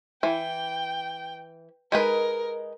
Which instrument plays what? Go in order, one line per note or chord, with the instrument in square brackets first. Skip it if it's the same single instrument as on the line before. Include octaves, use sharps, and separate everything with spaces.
[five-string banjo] E3 [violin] G5
[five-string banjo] G#3 D#4 B4 [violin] A#4